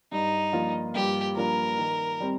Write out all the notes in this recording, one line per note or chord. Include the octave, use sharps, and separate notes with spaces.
G2 D#4
F3 A#3 D4 F4
G2 G4
F3 A#3 D4 F4 A#4
D#3
G3 C4